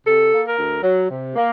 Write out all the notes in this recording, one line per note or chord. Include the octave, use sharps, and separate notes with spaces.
C3 A4
A#3
A#4
D2
F#3
C3
A#3